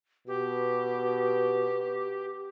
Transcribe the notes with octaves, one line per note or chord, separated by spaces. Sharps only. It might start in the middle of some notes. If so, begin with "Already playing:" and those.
B2 G4